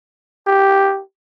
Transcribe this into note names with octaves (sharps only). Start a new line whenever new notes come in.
G4